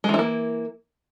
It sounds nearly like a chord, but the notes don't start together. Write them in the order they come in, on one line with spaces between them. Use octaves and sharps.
G#3 E3 E4 A#3